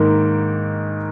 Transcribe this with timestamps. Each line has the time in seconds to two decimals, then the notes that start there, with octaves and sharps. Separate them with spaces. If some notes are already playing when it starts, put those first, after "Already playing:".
Already playing: G#2 D#3 A#3